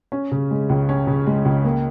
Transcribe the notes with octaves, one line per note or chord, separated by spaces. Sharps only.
C#4
C#3
G#3
C#2
C#4
C#3
G#3
C#2
A#3